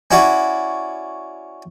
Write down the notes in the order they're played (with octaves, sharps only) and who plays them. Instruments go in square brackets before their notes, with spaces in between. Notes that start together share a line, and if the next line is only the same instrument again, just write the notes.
[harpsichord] C#4 E4 F#4 D5